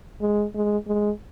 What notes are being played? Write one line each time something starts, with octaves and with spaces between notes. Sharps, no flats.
G#3
G#3
G#3